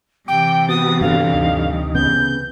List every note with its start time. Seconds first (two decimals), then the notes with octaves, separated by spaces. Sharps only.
0.28 C3 E3 G5 D6
0.69 B3 F#4 D#6 A6
1.01 G2 D3 F5
1.34 D2 D#4
1.95 C#3 B3 G6